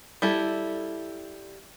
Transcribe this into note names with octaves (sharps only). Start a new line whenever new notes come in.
G3 E4 A4